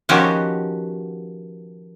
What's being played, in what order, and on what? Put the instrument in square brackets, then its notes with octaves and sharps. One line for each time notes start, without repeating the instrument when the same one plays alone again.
[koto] D#3 F3 B3 C#4 F#4 G4